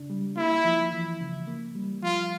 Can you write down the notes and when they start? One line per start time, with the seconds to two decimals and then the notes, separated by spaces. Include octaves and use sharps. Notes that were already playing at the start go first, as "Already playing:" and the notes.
Already playing: C#3 D4
0.10 G3
0.37 A#3 E4
0.65 F3
0.93 E3
1.21 C#3
1.47 A#3
1.75 G3
2.03 F3 F4